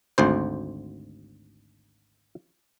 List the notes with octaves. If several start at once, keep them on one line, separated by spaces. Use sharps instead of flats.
G#1 D2 C5